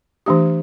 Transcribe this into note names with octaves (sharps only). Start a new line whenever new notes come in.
E3 A3 D4 G4